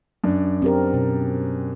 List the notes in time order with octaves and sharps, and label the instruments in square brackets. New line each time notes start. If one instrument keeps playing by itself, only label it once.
[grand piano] F#2 D4
[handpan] C4 G4 A#4
B2